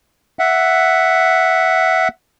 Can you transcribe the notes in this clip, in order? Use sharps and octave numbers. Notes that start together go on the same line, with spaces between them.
E5 F#5